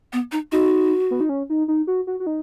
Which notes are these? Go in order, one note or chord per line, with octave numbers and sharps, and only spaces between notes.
B3
D#4
D#4 F#4
B3
D#4
C#4
D#4
D#4
F#4
F#4
F#4
D#4